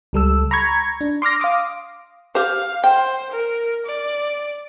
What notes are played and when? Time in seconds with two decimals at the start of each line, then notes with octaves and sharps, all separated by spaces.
0.13 C#2 G3 A4 E6
0.51 A#5 B5 C#6 G#6
1.01 D4
1.22 C6 D6 F6 A#6
1.40 F5 C6 D6 D#6
2.35 G4 C5 F5
2.84 C5 G5
3.31 A#4
3.86 D5